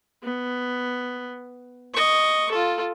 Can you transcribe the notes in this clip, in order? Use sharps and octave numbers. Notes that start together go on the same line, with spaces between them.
B3
D#5 C#6
F4 A4